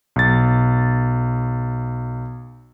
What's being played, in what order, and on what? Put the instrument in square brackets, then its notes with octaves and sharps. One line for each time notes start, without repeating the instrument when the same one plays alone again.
[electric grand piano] B1 A6